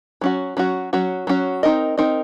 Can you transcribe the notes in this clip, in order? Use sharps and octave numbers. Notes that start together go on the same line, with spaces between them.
F#3 C#4 F#4
F#3 C#4 F#4
F#3 C#4 F#4
F#3 C#4 F#4
C4 D#4 A#4 D#5
C4 D#4 A#4 D#5